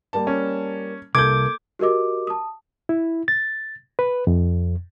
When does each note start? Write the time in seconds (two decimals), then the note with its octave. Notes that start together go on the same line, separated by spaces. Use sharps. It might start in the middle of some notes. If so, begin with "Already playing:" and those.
0.13 G3 A#3 A5
0.27 C#4
1.15 C2 A#3 A4 D6 G6 G#6
1.79 F#4 G4 A#4 D#5 D6
2.27 A5 D#6
2.89 E4
3.28 A6
3.99 B4
4.27 F2